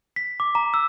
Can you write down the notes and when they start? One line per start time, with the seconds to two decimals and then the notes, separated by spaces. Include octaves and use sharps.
0.16 B6
0.40 D6
0.55 A#5
0.74 E6